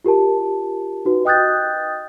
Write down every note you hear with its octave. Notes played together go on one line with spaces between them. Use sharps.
F4 G4 A#4 A5
D#4 F#4 B4
D#5 G5 D#6 F#6 G6 A6